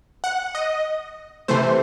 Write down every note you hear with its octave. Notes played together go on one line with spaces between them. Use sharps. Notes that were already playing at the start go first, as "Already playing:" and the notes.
F#5
D#5
C3 E3 A3 C5